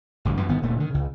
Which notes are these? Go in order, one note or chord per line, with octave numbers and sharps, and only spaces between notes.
A1 D2 G2
F#2 E3
G1 D#3 B3
D1 A#2 A3
D3 D#3
C#2 C#3